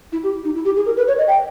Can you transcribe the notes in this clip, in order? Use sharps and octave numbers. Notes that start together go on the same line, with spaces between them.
E4
G4
D#4
E4
G4
G#4
A#4
B4
C#5
D#5
G5